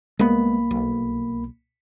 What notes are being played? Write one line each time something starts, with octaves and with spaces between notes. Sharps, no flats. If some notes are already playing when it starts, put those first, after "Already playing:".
C2 G#3 A#3 B3 B5
B1